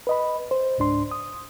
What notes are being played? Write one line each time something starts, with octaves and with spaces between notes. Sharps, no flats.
B4 D#5 B5
C5
C#2 G#2 D4 C6
D#6